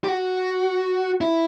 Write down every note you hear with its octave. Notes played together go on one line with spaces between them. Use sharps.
G4
F#4
E4